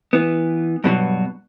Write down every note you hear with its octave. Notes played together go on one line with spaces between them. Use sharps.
E3 B3
G2 B2 E3 F#3